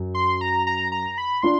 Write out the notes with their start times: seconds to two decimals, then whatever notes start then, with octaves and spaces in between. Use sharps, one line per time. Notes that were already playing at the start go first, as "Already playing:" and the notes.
Already playing: F#2
0.14 C6
0.41 A#5
0.67 A#5
0.92 A#5
1.18 B5
1.43 D4 F4 C6